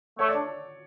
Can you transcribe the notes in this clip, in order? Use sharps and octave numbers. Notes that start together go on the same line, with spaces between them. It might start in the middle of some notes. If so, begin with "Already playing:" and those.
A3 C#5
D5
D4